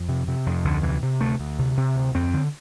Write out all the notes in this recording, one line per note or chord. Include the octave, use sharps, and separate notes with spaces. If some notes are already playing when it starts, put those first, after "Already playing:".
Already playing: F2
C3
C3
F2
D2 D3
C3 E3
C3
D2 A3
D2
C3
C3
D2
F2 C4
D3